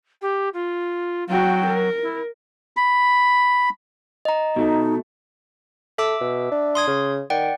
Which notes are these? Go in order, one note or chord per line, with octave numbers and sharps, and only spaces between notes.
G4
F4
F#3 F#4 G5
A#4
E4
B5
D#5 A#5
B2 A3 D#4
A4 E5 D6 E6
B2
D4
C6 D#6 G#6
C#3
D#3 D5 F#5 G5